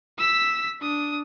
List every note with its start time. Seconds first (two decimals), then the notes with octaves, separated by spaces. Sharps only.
0.18 E6 B6
0.80 D4 D#6